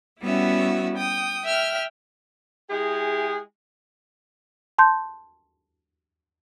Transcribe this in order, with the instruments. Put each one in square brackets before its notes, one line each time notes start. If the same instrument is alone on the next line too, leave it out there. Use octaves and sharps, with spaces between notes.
[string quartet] G3 B3 C#4 E4 F#4 E5
G5 D#6
E5 G5 F6
[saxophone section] G#3 E4 G4 G#4
[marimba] A5 C6 G6